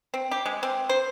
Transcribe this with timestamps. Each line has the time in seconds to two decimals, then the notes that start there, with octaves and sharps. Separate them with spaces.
0.14 C4
0.31 G4
0.46 G#3
0.63 C4
0.89 C5